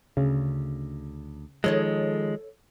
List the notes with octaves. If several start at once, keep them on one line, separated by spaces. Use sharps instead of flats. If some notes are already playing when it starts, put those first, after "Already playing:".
D2 C#3
D#3 F3 G#3 A4 C#5 D#5